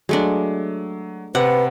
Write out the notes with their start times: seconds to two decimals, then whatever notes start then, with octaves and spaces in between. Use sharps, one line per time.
0.09 F#3 G#3 A3 D4
1.35 C3 B4 F#5